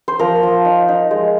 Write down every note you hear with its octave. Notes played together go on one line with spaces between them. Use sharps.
C5
F3 A#4
F3
D#4
D#4
G#3